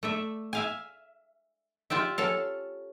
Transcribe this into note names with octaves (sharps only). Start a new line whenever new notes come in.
A3 D5 E5
E5 F5 G#5
F4 G4 D5 E5
C#4 A4 F5